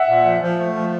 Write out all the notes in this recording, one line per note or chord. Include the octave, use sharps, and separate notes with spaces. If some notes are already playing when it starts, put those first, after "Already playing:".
Already playing: E5 F#5
A#2
F3
F3
A3
F3